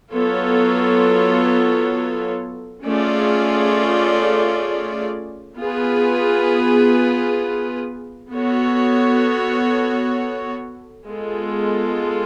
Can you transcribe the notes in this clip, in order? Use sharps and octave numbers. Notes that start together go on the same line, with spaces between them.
F#3 B3 F4 A4 C#5
A3 C#4 F4 G#4 D5
B3 F4 G#4 B4
B3 F#4 A4 C#5
G#3 B3 F4 A4